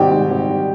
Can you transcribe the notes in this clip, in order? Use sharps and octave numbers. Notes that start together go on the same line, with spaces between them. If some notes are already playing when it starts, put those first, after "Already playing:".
Already playing: G#1 G3 D#4 G4
G#2
G#1
G3